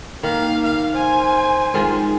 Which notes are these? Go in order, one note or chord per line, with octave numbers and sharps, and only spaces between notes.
D#3 A#3 F5
F5
C5 G#5
D#3 G#3 F4